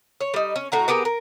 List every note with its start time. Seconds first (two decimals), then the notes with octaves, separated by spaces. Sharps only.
0.20 C#5
0.34 G3 D#4
0.56 C#4
0.72 A2 F#4 A#5
0.88 B3 G4 G#4 A#4
1.05 A#4